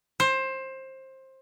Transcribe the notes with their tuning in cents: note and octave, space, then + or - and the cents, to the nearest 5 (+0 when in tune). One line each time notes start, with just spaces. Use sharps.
C5 +20